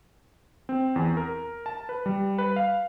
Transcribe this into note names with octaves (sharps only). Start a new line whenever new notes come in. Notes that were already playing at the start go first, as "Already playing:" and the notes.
C4
E2
A#4
A5
B4
G3
B4
F5